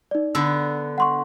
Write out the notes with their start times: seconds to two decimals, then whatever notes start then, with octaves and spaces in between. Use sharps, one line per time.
0.11 D#4 D5
0.35 D3 B3 E6
0.98 F#5 C6 C#6